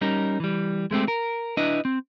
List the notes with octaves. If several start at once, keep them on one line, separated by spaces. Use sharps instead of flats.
G3 C#4 D#4 A#4
E3 G3
G#3 A3 C4 G4
A#4
D4 E4 B4 D#5
C4